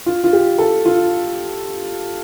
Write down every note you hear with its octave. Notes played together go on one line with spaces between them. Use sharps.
F4
F4
G4
A4
F4